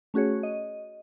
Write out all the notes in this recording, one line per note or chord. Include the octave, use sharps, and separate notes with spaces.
A3 C#4 F#4 G#4 C#5
D#5